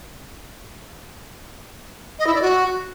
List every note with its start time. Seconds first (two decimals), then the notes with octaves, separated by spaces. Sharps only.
2.19 D#5
2.27 E4
2.34 D5
2.42 F#4